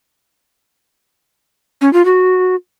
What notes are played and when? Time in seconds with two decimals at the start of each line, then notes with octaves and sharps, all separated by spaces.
1.81 C#4
1.93 F4
2.05 F#4